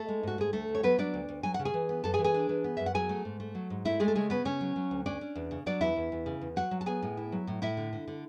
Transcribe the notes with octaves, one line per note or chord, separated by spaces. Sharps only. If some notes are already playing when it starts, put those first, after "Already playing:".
Already playing: A3 A4
G#3
G#2 F#4
G#2 G#4
D2 A3 A4
D2
C#5
F#3 B3 B4
F#3 D4 D5
D2
D2
F#3 G#5
F#5
C#3
G#4 G#5
E3
B3
F#2 A4 A5
G#4 G#5
E3
G#4 G#5
D4
E3
B3
F#2 E5
F#5
F#3 G#4 G#5
A3
G#2
A3
F#3
G#2
A3 E4 E5
G#3 A3 G#4
A4
C#3 G#3 G#4
B3 C#4 B4
C#3 C#4 C#5
F#3
F#3
D2
C#4 D4 D5
C#4
E2
C#3
F#3 D4 D5
E2 E4 E5
E2
E2
C#3
E2
F#3 F#4 F#5
F#3
A5
B3 G#4 G#5
A2
E4
F#3
A2
A2 E4 E5
D3
D3
D3